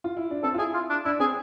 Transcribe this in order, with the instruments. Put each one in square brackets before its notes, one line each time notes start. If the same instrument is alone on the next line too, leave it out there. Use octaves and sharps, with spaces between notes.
[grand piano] F4
E4
D4
[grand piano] C4 [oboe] A4
[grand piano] F4
[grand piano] E4 [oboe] G#4
[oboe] F4
D4
[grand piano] D4 [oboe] E4
[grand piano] C4 [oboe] G#4